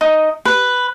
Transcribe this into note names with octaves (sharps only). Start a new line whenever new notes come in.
D#4
B4